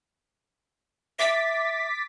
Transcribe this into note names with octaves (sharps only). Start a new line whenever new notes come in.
E5 D6 A6 B6